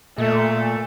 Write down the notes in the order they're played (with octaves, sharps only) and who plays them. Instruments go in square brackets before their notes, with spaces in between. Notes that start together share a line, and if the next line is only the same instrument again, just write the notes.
[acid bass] A#2 [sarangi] A3